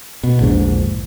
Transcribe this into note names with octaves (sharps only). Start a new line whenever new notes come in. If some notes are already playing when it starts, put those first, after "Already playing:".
B2
A#1 E2 G#2 D3